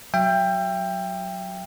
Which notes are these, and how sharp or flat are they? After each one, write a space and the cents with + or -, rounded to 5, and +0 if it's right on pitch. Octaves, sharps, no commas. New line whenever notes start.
F#3 +0 E5 +35 G5 +15